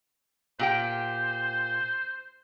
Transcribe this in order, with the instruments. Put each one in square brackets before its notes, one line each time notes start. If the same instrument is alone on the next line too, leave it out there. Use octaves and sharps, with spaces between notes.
[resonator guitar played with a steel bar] A#2 G4 G5 [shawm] C5